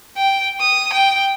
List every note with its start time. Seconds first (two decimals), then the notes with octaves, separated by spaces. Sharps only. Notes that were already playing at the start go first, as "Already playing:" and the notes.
0.17 G5
0.61 D#6
0.93 G5